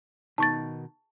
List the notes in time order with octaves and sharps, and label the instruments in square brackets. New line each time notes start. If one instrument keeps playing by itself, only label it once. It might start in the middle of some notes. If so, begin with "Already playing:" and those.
[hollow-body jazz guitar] B2 D#3 D#4 [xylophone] A5 C#6 A6